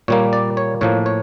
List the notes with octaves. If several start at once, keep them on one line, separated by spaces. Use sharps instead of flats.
A#2 G3 A#3 C#5
D5
C#5
A2 F3 A#3 C#5
C#5